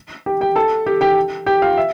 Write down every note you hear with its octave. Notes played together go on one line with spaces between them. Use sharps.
G4 G5
G4 G5
A4 A5
G4 G5
G4 G5
G4 G5
F4 F5
E5